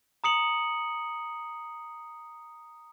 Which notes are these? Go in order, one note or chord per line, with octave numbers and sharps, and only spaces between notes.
A#5 D#6 C#7 F#7